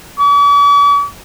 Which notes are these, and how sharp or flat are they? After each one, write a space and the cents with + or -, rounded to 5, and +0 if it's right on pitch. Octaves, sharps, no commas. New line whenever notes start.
D6 -45